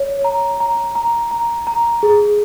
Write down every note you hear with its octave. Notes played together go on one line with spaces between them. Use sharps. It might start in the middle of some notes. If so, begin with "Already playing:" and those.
Already playing: C#5
A#5
A#5
A#5
A#5
A#5
G#4